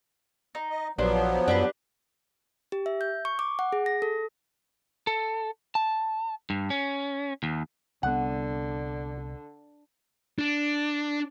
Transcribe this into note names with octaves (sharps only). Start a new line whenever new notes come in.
D#4
D#5
A#1 F3 F#3 B3 D4 G4 C5
F#2 D4 G4 B4
G4
E5
G6
C#6
D6
F#5
G#4
A#6
A4
A4
A5
G2
C#4
D#2
C2 D3 G3 B3 F#5
D4